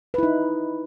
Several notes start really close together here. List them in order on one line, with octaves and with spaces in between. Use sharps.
B4 E4 D#4